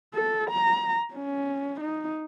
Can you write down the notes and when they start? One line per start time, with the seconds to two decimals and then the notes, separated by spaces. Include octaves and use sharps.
0.14 A4
0.50 A#5
1.14 C#4
1.80 D#4